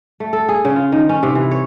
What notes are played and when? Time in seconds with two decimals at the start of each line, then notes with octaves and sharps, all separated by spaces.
0.20 A3
0.33 A4
0.49 G#4
0.65 C#3
0.76 F4
0.92 D#3
1.09 C#4
1.23 C3
1.35 E3
1.51 C#5